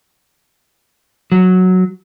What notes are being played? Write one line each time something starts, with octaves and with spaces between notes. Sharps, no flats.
F#3